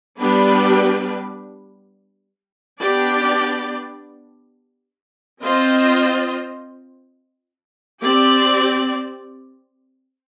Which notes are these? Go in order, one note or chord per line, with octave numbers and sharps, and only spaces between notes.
G3 B3 D4 G4 B4
B3 D4 G4 D5
C4 F4 C5 D#5
C4 G4 D5